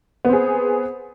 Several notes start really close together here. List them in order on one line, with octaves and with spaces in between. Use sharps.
B3 C4 G#4